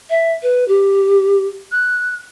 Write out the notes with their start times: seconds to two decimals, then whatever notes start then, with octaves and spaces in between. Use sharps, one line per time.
0.10 E5
0.43 B4
0.68 G4
1.72 F#6